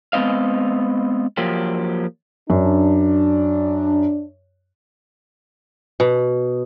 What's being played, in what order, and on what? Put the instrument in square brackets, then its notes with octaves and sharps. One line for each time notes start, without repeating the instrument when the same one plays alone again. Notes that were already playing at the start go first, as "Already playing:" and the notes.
[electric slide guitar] G#3 B3 C4 D#5 F5
F3 F#3 A#3 G4
[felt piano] F#2 [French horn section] D4
[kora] B2